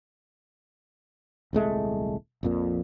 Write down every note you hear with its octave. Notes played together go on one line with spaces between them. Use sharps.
D#1 C2 G#3 A3
A#1 F2 A#2